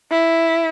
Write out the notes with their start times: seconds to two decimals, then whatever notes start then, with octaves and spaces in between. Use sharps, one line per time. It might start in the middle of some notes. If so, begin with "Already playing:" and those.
0.11 E4